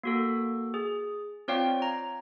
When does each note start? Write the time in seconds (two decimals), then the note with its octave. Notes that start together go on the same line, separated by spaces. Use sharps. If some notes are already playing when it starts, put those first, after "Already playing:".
0.03 A#3 F#4 A4
0.74 G#4
1.48 C4 F4 C#5 D5 F5 G5
1.82 A#5